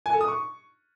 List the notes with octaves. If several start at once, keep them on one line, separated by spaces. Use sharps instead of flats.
G#5
A4
D#6
C#6